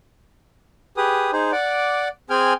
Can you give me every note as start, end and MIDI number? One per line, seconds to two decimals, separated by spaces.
0.97 1.31 67
0.97 1.31 68
0.97 1.31 71
0.97 1.31 87
1.33 1.51 63
1.33 1.51 68
1.33 1.51 72
1.52 2.08 74
1.52 2.08 78
1.52 2.08 86
2.30 2.53 60
2.30 2.53 68
2.30 2.53 79
2.30 2.53 80
2.30 2.53 89